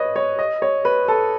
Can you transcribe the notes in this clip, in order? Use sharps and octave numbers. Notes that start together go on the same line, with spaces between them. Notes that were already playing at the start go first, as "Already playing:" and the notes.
Already playing: B4 C#5 D#5
C#5
D#5
C#5
B4
A4